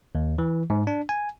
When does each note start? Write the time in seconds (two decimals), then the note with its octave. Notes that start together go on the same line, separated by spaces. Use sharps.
0.15 D#2
0.38 E3
0.70 G#2
0.87 D4
1.09 G#5